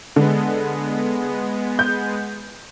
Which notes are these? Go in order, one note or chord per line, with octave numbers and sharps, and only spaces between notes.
D3 G#3 B3
G6